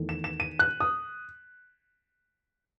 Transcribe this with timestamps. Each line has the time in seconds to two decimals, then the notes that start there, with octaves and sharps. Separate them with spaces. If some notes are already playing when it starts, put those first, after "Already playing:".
Already playing: E2 D#3 A3
0.09 E7
0.24 E7
0.40 D#7
0.59 F#6
0.80 D#6